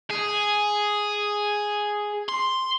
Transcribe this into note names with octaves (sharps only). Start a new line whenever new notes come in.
G#4
C6